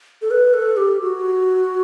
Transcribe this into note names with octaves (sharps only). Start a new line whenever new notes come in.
A4
B4
A4
G4
F#4